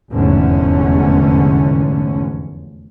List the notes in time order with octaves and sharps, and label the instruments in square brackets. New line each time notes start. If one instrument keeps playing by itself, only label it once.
[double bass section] F1 E2 G#2 D3 C#4